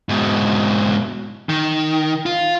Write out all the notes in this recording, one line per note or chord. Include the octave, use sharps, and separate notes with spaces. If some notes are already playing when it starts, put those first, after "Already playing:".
G#2 B2
D#3
F4